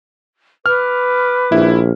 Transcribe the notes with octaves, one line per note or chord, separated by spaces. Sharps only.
B4 D6 F6
A#1 E4